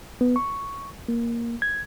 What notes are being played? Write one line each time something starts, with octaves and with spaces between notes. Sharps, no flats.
B3
C#6
A#3
G#6